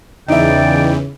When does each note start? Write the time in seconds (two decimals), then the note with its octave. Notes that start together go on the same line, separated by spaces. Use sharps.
0.28 E2 C#3 E3 D#4 D5 E5 G5